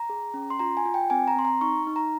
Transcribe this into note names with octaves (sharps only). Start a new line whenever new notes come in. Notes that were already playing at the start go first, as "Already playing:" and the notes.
Already playing: A#5
G#4
C#4
C6
F4 A#5
G#5
F4
G5
C4 G#5
A#5
C4 C6
A#5
D#4 C#6
D#4
A#5